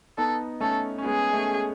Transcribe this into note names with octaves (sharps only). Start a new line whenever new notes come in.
B3 D#4 A4
A3 C#4 A4
C#4
G#3 B3 G#4
A3 C#4